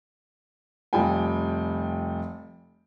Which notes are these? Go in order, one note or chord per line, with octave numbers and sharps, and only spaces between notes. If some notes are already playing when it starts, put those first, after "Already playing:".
F1 G3 F4 G5 G#5